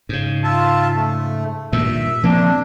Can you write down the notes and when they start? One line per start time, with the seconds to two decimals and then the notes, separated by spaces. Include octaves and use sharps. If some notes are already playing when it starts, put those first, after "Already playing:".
0.09 G#2 C#3
0.44 F4 E5 A5
0.95 A3
1.73 G2 A#2 D#3 E5
2.23 F3 A#3 C4 D4